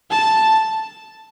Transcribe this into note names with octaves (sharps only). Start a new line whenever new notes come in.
A5